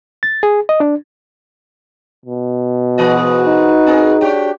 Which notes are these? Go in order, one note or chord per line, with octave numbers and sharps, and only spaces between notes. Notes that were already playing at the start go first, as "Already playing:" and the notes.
A6
G#4
D#5
D4
B2
G#2 E3 F#4 B4 D#5
D#4
C4 G#4 A#4
D4 F#4 G4 C#5 G5